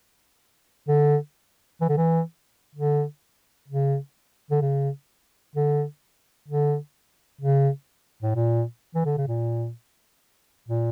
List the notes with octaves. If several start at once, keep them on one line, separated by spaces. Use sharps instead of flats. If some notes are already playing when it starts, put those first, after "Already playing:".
D3
E3
D3
E3
D3
C#3
D3
C#3
D3
D3
C#3
A2
A#2
E3
D3
C#3
A#2
A#2